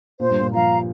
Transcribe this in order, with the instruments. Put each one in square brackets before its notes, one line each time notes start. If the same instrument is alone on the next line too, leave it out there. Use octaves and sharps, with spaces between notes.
[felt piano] A#2 [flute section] C5
[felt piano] G2
A#2
[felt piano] F3 [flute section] F5 A#5